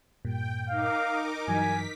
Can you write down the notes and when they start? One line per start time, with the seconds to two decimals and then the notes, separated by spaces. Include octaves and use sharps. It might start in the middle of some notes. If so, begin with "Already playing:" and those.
0.25 G2 A#2 G5
0.70 D#4 A#4 F5 D6
1.14 D#6
1.48 G2 E3 F#3 G#5 B6